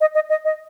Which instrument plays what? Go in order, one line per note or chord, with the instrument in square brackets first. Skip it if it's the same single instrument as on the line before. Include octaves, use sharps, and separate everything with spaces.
[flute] D#5
D#5
D#5
D#5